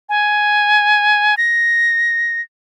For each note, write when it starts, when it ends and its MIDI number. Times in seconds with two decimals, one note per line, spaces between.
0.09 1.35 80
1.38 2.41 94